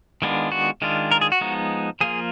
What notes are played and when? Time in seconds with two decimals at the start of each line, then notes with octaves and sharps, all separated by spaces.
0.22 D#3 G#3 B3 D4 F4
0.52 F#4
0.82 D#3 G#3 D4 F4
1.11 A#4
1.21 G#4
1.32 F#4
1.41 F3 G#3 B3 D#4
2.01 F3 A#3 F4 G#4